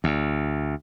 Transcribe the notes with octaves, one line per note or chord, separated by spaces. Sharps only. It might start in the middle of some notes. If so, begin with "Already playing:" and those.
D2